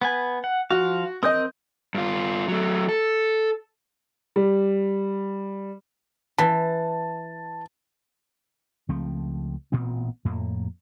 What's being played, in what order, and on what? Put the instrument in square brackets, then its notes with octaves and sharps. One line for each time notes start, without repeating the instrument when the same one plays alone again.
[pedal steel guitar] B3 B4 G#5
F#5
[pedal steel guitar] F3 F5 [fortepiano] F#4
[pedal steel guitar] C4 A#4 G6 [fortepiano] D#5 D#6
[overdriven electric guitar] G2 F4
F#3 A3
A4
[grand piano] G3
[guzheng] E3 [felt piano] A5
[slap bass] C#2 F3 A3 C4
A1 A#2 B3 C4
F2 A2 A#3